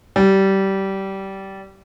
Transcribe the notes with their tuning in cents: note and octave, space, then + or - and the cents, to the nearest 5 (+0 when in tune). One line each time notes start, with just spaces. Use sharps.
G3 -20